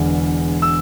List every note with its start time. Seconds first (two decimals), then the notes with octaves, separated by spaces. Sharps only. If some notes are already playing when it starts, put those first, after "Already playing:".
Already playing: E1 E2 D3
0.62 E6